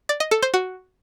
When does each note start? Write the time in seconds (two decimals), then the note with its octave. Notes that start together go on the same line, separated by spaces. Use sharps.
0.09 D5
0.20 D#5
0.31 A4
0.42 C5
0.54 F#4